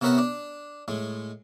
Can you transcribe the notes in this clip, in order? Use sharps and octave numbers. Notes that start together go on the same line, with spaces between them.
C3 B3 C#4 A#4 E5 F#5
D4
A2 G#3